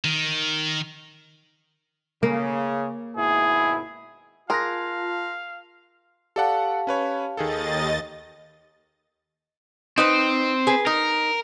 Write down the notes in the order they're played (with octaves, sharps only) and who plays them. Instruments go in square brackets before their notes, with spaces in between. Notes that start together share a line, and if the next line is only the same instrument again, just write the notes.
[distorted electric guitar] D#3
[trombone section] C#3 [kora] A#3
[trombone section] G#1 B2 E4 [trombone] G#4
[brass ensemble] F4 A5 [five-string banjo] G#4 A#4 [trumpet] F5 [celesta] C6 F#6 A#6
[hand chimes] G4 F5 A5 [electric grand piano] A4 D5 F#5
[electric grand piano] C#4 B4 C#5
[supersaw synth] D#2 D#5 A6 [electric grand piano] D#3 G#4 A4
[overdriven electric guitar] C4 [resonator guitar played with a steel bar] D#4 B4 C5
[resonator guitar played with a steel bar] G#4 B4
[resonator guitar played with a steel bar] D#4 [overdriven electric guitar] A#4